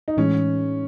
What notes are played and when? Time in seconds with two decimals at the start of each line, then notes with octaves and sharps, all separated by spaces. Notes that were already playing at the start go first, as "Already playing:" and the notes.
0.08 D#4
0.17 A2 E3 G#3 C#4